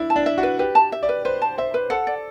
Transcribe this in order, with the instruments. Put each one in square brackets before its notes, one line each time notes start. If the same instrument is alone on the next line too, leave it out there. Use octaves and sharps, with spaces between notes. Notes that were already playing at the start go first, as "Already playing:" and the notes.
Already playing: [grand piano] D4 E4
[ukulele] A5
[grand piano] D4
[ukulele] E5
[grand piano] F#4
[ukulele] B4
[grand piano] G4 [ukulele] B4
[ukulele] A5
E5
[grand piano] D5
[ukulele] B4
[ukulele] B4 [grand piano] C5
[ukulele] A5
[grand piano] C5 [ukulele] E5
[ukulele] B4
[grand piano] A4 [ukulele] F#5
[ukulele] D5